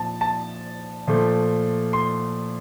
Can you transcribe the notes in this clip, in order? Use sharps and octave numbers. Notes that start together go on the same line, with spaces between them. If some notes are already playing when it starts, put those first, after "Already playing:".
Already playing: A#2 F3 C4 A5
A5
A#2 F3 A3
C6